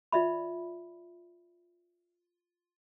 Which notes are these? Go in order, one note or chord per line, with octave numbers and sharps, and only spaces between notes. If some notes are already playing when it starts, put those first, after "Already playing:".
F4 D5 E5 B5